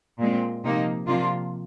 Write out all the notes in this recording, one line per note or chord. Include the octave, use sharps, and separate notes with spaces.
A#2 G#3 C4
C3 F3 A#3 D#4
C3 F3 A#3 D4 F4